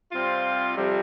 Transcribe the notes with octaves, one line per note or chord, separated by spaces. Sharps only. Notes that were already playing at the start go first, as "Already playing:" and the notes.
C3 G3 C4 F4
F2 C3 G3